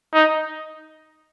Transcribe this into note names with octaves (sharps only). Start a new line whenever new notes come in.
D#4